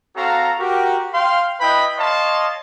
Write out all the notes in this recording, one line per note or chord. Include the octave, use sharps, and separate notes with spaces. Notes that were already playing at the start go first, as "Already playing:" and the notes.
C4 F#4 A4 F5 A#5
F#4 G4 A#4
F5 G5 C6
E4 B4 D#5 E5 G5 B5
C#5 D#5 F5 A5 C6